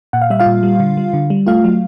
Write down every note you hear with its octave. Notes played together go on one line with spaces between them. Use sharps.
A#2 F#5
F5
G3 E5
F4 F5
A#2
G3
D3
G3
D3
G3
A3 F4 F5
F#3